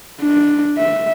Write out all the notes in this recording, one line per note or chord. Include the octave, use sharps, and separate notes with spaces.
D4
E5